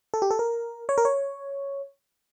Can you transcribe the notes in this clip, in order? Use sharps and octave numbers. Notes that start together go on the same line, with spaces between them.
A4
G4
A4
A#4
C#5
A#4
C#5